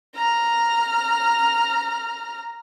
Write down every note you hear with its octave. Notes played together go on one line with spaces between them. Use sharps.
A#5 F6